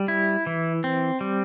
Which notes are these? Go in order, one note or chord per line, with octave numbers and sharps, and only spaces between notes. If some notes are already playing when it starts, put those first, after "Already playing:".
Already playing: G3
E4
E3
C4
G3